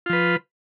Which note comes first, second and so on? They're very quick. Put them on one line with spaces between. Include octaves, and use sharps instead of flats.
F4 F3 B4